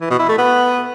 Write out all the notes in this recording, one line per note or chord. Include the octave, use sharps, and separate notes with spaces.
E3
B2
E4
A3
B3